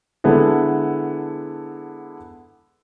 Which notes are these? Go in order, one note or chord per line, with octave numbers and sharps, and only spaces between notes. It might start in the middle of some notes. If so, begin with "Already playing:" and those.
D3 G#3 B3 E4 A4